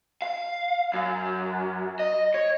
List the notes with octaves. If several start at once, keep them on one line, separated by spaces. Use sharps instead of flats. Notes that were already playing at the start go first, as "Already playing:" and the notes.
F5
F#2
D#5
C#5